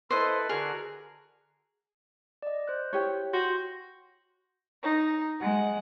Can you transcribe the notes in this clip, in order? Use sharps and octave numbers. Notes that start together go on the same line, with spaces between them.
E4 A4 B4 C5 D#5
D3 F#4 G#4 A#4
D5 D#5
C5 F#6
E4 G4 C#5
F#4 C6 G6 A#6
D#4
G#3 F#5